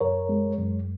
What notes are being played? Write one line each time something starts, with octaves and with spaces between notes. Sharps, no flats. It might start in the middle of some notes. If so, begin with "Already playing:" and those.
F#2 A#4 C#5
G#3
F#2